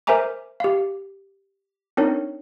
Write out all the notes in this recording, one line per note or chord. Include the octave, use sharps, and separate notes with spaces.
A#4 C5 E5 G#5 A#5 D6
G4 F5
C4 D4 D#4 A#4 C#5